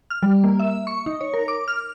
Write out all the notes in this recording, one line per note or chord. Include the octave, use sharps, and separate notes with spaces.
F6
G3
A#3
E5
C#6
D#4
C#5
A#4
D6
F6